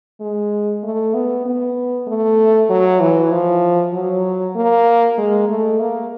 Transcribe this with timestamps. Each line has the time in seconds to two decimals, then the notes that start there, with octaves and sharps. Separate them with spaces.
0.21 G#3
0.84 A3
1.14 B3
1.46 B3
2.07 A3
2.70 F#3
3.00 E3
3.32 F3
3.93 F#3
4.56 A#3
5.18 G#3
5.49 A3
5.80 A#3